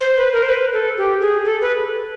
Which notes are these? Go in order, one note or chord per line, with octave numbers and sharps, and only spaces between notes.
C5
B4
A#4
C5
B4
A4
G4
G#4
A4
B4